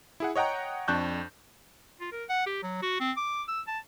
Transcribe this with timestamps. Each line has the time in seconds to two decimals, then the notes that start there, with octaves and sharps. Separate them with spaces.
0.20 E4 G#4 F#5
0.36 C#5 D#5 F#5 G5 A#5
0.88 F2 D4 A5 C#6 F#6 G6
2.00 F4
2.12 A#4
2.29 F#5
2.47 G4
2.63 F#3
2.82 F#4
3.00 C4
3.17 D6
3.48 E6
3.68 A5